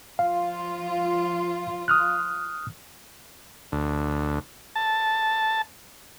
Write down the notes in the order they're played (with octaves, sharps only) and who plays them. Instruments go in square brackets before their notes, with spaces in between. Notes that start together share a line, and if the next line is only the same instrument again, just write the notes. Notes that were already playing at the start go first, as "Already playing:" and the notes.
[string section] F3 F4 [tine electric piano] F5
[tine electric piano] D#6 F6 F#6
[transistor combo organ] D2
A5